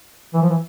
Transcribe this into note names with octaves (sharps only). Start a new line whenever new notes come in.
E3
F3
E3